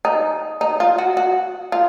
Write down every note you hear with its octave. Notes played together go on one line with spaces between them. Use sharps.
D#4
D#4
F4
F#4
F#4
F4